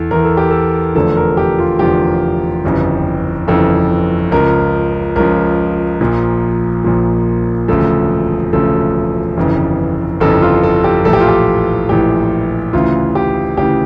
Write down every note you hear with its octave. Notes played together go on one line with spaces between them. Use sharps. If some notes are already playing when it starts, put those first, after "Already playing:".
Already playing: E2 E3 A4
E2 E3 A#4
A4
G4
A4
F1 E2 D3 F3 A4
A#4
G4
F4
F1 E2 D3 F3 G4
G1 F2 C#3 E3
G1 F2 C#3 E3 A4
C#2 C#3 F3 A#4
C#2 C#3 F3 A#4
A#1 A#2 F3
A#1 A#2 F3
E1 D2 C#3 F3 A4
E1 D2 C#3 F3 A4
G1 F2 C#3 E3
G1 F2 C#3 E3 A4
F4
A4
G4
A#1 A2 E3 A4
G4
F4
G4
A#1 A2 E3 G4
D2 C#3 E3 F4
G4
D2 C#3 E3 G4